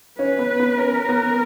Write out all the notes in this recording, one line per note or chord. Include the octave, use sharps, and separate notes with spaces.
C#4 B4
B3
B3
C#4 A#4
B3